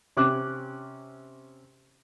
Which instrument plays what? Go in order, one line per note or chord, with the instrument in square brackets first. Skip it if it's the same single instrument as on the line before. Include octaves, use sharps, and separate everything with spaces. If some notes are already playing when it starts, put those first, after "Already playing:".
[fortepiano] C3 C#4 D6 F#6